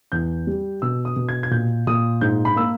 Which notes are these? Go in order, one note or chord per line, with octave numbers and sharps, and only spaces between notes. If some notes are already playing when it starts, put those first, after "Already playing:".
E2 G6
G3
B2 E6
D#6
B2
G#6
G#6
A#2 G6
A#2 D#6
G#2 G6
B5
A#3 E6